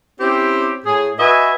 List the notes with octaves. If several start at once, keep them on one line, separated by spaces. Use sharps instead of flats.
C4 C#4 E4 G4
A2 G#4
F#4 B4 D#5 E5 G#5